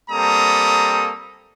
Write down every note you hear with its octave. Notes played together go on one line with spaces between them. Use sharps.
G3 A#3 C4 A4 A#5 D#6